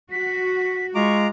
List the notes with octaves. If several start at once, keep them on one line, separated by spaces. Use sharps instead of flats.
F#4 B6
G#3 F4 A#5 C#6 D6